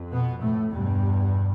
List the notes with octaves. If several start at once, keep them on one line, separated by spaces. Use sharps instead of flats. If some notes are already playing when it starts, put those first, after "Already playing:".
Already playing: F2
B2 B3
A2 A3
E2 G2 B2 G3